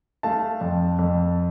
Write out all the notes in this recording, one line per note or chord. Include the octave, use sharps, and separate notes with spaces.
A3 F5 A5
F2
F2